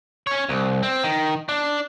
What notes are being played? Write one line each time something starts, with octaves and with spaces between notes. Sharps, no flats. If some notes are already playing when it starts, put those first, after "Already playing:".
C#4 C#5
C2
C4
D#3
D4